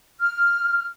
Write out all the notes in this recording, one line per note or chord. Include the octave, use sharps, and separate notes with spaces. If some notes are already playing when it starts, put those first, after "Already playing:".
F6